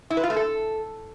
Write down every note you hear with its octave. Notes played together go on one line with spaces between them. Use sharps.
E4
B4
F4
A3
A4